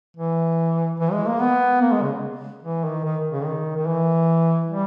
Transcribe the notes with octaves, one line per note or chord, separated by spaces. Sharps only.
E3
E3
G#3
A#3
B3
A#3
G#3
C#3
E3
D#3
D#3
C#3
D#3
D#3
E3
G3